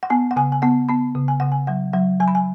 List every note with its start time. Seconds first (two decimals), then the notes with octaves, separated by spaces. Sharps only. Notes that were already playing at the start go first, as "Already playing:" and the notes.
0.03 F#5
0.10 B3 G#5
0.31 F#5
0.36 C#3 G#5
0.52 G#5
0.62 B3 F#5
0.89 B3 B5
1.15 C#3
1.28 G#5
1.40 C#3 F#5
1.52 G#5
1.67 F#3 F#5
1.93 F#3 F#5
2.20 F#3 G#5
2.28 B5
2.35 G#5